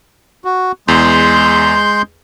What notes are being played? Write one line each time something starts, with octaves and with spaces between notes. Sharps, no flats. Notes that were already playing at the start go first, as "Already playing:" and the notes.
F#4
E2 G#3 C6 G6